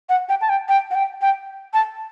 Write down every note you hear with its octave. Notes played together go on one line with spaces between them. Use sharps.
F#5
G5
A5
G5
G5
F#5
G5
G5
A5